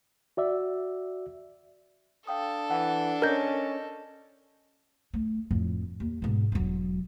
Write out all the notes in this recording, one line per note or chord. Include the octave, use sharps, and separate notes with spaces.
F#4 D5 E5
D4 A4 F5 G5 D#6
E3 F#5 A5
C#4 A#4 D#5 A5 G6 A#6
A3
F2 A2
D#2
G#2 B2
E1 F#3